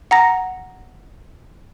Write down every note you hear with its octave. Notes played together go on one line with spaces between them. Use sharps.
F#5 A#5 A#6